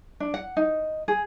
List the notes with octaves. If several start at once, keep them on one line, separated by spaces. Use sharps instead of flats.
D4
F#5
D#4
G#4